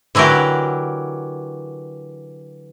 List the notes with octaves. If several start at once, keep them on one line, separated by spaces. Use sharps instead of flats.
D3 E3 F#3 G4 A#4